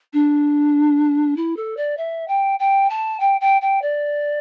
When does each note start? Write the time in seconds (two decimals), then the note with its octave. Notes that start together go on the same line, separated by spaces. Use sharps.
0.13 D4
1.36 E4
1.56 A4
1.77 D5
1.97 E5
2.28 G5
2.59 G5
2.90 A5
3.20 G5
3.41 G5
3.61 G5
3.82 D5